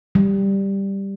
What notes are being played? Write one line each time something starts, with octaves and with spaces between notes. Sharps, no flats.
G3